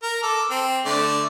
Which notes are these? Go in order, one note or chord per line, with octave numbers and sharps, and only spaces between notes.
A#4
A4 D6
C4
D3 A3 D5